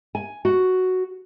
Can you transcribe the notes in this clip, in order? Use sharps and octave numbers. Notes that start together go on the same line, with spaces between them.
G#5
F#4